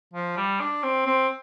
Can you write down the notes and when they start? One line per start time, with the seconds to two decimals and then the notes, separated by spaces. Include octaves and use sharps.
0.13 F3
0.37 G3
0.60 D4
0.83 C4
1.06 C4